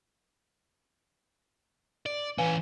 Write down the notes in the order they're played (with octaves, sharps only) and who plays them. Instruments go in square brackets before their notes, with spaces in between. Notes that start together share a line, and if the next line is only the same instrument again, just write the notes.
[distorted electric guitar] D5
[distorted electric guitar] E3 C#4 [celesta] B4 F5 G#5